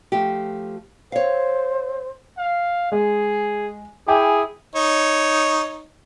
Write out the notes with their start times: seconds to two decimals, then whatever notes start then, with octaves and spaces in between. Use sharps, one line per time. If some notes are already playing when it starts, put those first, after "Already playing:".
0.12 F3 A3 G4
1.12 C5 C#5 F5
2.38 F5
2.92 G#3 G#4
4.08 E4 G#4 G5 G#5 D6
4.75 D#4 C#5